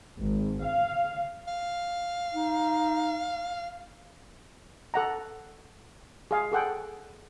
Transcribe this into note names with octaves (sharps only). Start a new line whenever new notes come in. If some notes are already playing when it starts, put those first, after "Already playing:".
G#1
F5
F5
D#4
A4 F#5 A#5
G#4 F5
G#4 A4 F#5 G5